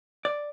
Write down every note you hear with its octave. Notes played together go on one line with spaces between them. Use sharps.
D5